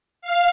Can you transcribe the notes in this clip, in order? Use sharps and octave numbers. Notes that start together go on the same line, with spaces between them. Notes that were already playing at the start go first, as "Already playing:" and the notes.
F5